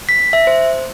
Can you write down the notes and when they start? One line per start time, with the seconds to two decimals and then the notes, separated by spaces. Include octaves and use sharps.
0.09 B6
0.33 E5
0.47 C5